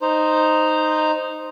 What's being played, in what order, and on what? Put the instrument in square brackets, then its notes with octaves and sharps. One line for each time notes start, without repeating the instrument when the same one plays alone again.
[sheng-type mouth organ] D#4 C5